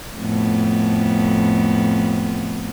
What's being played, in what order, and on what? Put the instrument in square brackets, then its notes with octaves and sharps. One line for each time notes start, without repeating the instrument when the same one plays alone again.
[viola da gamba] F2 A2 B3